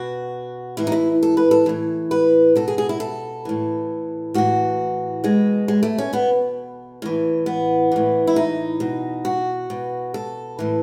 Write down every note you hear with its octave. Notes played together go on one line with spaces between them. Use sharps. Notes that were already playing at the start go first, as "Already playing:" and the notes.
Already playing: B2 F#4
A2 E3 E4
D#4
E4
A4
B4
A4
A2 E3
B4
B2 A4
G#4
G#4
E4
A4
A2 E3
A2 E3 F#4
B2 G#3
G#3
A3
C#4
B2 B3
A2 E3
B3
A2 E3
E4
D#4
B2
F#4
B2
A4
A2 E3